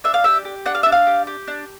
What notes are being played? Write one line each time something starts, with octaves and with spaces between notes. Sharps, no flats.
D4 E5
F5
G4 E5
G4
D4 F#5
F5
D4 E5
F5
G4
G4
D4